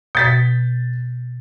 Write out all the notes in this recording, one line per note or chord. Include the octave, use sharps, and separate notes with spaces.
B2 G6 A6 B6